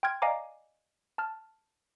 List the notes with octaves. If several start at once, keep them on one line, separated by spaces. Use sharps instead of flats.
G5 C6 F6 G#6
D5 D#5 F5 G#5 A#5 D6
A5 F6